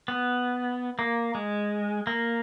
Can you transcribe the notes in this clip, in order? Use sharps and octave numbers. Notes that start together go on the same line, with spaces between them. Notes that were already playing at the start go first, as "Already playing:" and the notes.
B3
A#3
G#3
A#3